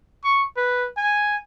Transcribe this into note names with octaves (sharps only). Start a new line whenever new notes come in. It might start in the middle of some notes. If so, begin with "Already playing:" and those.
C#6
B4
G#5